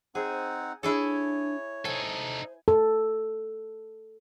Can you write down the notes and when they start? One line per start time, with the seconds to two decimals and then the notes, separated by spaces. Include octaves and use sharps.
0.15 C4 D#4 G#4 C5 F#5
0.83 D4 E4 G#4 A4 C#5
1.85 D#4 A4 C5 G#5
2.68 A4